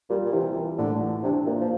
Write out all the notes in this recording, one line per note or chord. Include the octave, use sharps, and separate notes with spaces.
A#2 G3
A#2
C3 E3
E3
A2 D3
E3
C3 D4
A#2 A#3
F3